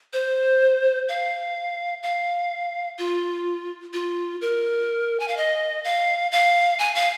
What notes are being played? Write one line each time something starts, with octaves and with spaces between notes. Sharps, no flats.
C5
F5
F5
F4
F4
A#4
G#5
F5
D#5
F5
F5
G#5
F5